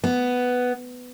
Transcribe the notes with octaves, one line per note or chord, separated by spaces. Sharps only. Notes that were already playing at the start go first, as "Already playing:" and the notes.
B3